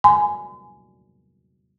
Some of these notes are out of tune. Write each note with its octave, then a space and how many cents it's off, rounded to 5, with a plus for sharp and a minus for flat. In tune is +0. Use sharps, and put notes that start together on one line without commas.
G#5 +10 C6 -45